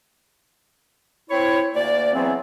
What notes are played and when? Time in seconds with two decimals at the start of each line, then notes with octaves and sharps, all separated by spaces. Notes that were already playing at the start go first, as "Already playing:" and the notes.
1.30 C4 E4 C#5
1.74 D2 A#3 D5
2.14 C#3 E3 F#3 B3 C4